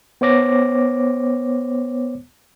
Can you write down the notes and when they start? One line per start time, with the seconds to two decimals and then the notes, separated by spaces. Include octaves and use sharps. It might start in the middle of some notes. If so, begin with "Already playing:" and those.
0.21 B3 C5 C#5 D6 A#6